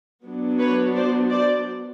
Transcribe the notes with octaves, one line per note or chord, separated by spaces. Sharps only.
F#3 B3 D4
B4 C#5
C5 D5
C5 D5